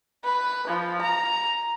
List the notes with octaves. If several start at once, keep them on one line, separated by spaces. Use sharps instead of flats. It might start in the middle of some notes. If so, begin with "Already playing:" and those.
B4
F3
A#5